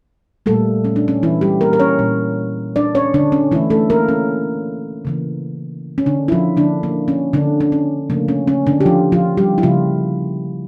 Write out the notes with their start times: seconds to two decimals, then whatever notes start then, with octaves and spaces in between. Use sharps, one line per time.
0.46 A#2 G3 A3 A#3 A4
0.85 C#4
0.96 D4
1.08 C#4
1.23 E3 E4
1.41 G3 G4
1.61 A#3 A#4
1.73 A#4
1.80 C#4 C#5
1.99 A#2 G3 A#3
2.76 D4 D5
2.95 C#4 C#5
3.14 D3 D4
3.32 C#4
3.51 D3 E3 E4
3.55 A3
3.70 A3 A4
3.90 A#3 A#4
4.09 C#4
5.05 C#3 E3 A#3
5.98 C#4
6.06 D3 D4
6.28 E4
6.32 F3 F4
6.57 D3 F3 A#3 D4
6.83 A#3
7.08 C#4
7.33 D3 D4
7.60 D4
7.72 C#4
8.10 C#3 F3 A3 A#3
8.28 C#4
8.48 C#4
8.67 D3 D4
8.81 G4
8.86 F3 F4
9.12 F3 F4
9.37 G3 G4
9.58 E4
9.62 C#3 F3 A#3 F4